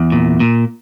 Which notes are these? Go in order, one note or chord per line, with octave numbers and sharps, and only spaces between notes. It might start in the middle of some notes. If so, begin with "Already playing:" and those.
Already playing: E2
A#2
A#2